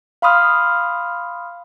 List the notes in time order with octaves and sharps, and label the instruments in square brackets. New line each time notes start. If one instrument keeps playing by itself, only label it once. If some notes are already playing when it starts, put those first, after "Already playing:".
[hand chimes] F5 B5 C6 D#6 F6